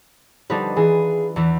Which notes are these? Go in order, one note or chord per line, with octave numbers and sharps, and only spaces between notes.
D3 F3 G3 D4 D#4 B4
E3 F4 G#4
E2 E3